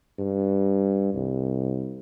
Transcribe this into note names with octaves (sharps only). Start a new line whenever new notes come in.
G2
C2